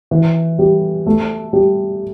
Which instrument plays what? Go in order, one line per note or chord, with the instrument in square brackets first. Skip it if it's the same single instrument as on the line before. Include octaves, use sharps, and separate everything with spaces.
[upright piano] E3
G3
A3
G3